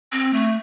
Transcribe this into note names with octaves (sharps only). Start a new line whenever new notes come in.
C4
A3